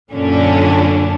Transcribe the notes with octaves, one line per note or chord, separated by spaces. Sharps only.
F#2 A#2 D3 C#4 D4